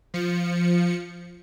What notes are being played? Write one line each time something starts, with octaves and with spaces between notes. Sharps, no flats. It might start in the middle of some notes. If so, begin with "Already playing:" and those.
F3 C#7